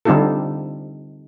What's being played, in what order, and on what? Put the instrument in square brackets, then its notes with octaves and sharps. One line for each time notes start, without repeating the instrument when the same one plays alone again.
[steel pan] D3 G3 C4 D#4 F4 A4